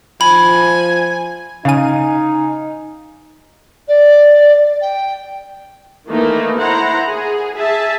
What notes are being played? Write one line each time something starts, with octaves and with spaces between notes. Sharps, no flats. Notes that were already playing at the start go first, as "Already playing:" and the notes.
F3 G#5 B5
C#3 D#4 F5 G#5 D#7
D5
G5
D#3 E3 A3 A#3 D#4
E4 C5 F#5 A#5
G#4
G#4 E5 A5